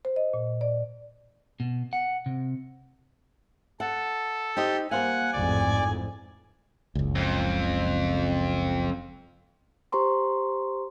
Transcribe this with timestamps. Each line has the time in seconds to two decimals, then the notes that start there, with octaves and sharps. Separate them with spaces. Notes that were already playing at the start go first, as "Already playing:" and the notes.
0.05 C5
0.16 D#5
0.34 A#2
0.61 D5
1.60 B2
1.93 F#5
2.26 C3
3.80 A4 F#5
4.57 D#4 G4 C5 D#5
4.91 G3 A#3 C5 F5 F#5 G#5
5.33 A1 F2 G#2 D5
6.95 F#1 C#2
7.15 F2
9.92 G4 C5 A#5 C6 C#6